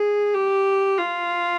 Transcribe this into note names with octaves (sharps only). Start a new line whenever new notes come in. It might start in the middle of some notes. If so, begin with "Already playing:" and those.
Already playing: G#4
G4
F4